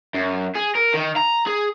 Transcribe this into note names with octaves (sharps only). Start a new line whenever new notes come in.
F#2
G#4
A#4
D#3
A#5
G#4